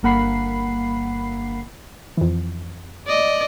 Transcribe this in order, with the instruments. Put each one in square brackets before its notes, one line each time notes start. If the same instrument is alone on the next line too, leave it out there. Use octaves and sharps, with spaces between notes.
[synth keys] G1 A#3 F#5 B5 C7
[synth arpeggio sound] F2 E3
[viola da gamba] D5 D#5